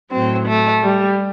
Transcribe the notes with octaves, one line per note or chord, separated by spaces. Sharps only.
A2 F#3 C4
A3
G3